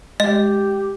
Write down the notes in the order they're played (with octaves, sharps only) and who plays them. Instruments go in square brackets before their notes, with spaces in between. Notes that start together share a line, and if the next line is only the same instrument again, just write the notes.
[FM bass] G#3 [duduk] G4 [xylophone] D#5